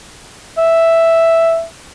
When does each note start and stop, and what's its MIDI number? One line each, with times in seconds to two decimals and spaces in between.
0.58 1.62 76